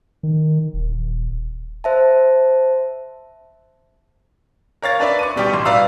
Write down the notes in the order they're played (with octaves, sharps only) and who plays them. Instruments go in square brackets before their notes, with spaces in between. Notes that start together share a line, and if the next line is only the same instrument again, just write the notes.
[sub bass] D#3
D#1
[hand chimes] C5 E5 A5
[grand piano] A#4 C#5 F5 A6
D4 B4 D5 E5
C#6 D6 D#7
B2 G3 G4 C#6
A1 C6
B4 D5 E5 F5 A#5 E6